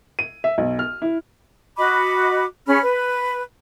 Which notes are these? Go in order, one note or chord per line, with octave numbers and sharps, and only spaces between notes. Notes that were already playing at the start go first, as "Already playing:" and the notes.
D#7
E5
B1
F6
E4
F#4 D#5 B5 D6
C#4 G#4 B5 F6
B4